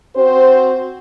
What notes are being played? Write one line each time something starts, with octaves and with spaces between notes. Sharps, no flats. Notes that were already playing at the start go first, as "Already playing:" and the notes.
C4 F#4 C5